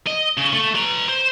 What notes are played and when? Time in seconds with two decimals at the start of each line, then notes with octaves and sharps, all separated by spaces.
0.07 D#5
0.38 C#3
0.53 A3
0.75 B4 A#5
1.08 C5